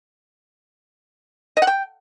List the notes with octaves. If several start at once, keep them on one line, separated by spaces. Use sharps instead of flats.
D#5
F#5
G5